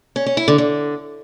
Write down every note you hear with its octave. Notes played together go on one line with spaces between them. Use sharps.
C#4
C#4
E4
D3
D3